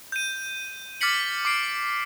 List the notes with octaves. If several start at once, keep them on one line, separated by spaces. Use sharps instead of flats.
G6 D#7
D6 F6 A6 B6 C#7 F#7
D6 C7 D7